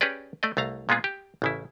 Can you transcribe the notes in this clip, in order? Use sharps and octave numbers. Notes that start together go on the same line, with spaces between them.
C#4 G4 G#4 B4 D5
A3 D5 D#5
C2 A3 F5 A#5
A#2 G#3 B3 F4 G#4
G4
A1 C#3 E4